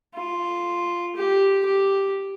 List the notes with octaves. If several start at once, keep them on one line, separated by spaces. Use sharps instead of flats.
F4
G4
G4